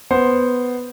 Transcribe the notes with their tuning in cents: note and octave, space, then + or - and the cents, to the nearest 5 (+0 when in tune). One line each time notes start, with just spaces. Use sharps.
B3 +5 C5 +0